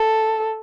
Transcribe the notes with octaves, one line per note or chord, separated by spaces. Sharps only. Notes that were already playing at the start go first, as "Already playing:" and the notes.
Already playing: A4